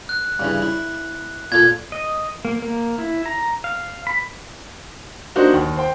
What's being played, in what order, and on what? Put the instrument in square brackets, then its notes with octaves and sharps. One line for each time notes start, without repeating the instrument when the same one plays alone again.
[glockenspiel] F#6
[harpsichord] G2 C#3 E3
E4
[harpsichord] A#2 F4 A4 [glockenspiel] G#6
[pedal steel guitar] D#5
A#3
A#3
E4
A#5
F5
B5
[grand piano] A#3 D4 D#4 F#4 C5 F5
D#2
C5 G5